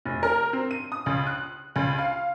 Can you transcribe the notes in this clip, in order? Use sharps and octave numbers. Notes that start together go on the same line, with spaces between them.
F1
A#4
C4
D#7
D#6
C#2
F#6
C#2
F5